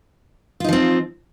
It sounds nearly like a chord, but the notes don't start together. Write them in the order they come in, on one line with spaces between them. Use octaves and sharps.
F4 D#4 F3 C4